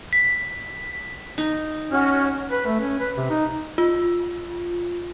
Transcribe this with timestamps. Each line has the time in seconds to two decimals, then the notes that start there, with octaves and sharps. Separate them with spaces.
0.13 B6
1.38 D#4
1.92 C#4 F#4 C#5 F6
2.51 B4
2.66 A3
2.80 C#4
2.99 B4
3.17 C3
3.30 D#4
3.78 F4